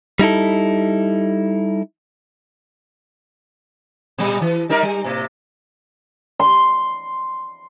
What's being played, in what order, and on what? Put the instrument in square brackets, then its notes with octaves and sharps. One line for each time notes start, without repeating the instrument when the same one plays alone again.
[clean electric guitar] G3 D#4 E4 A4
[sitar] A#2 G3
E3
G3 D#4 A#4
G3
A2 C3
[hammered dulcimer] C6